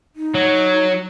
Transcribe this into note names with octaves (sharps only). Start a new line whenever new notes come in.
D#4
F#3